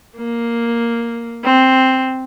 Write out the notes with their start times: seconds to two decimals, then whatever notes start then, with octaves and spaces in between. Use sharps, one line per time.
0.17 A#3
1.45 C4